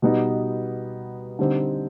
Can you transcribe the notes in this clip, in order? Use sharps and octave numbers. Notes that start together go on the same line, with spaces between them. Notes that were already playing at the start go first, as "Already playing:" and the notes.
B2 G3 B3 D#4
D3 G3 C4 D#4